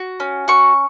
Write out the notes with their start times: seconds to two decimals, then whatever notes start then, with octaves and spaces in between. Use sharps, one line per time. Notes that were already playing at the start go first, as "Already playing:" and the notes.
Already playing: F#4
0.20 C#4
0.48 F#4 C#6